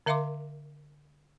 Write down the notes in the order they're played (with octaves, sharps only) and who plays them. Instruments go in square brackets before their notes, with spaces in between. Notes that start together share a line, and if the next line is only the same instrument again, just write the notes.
[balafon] D3 A#4 E5 F5 C6 D6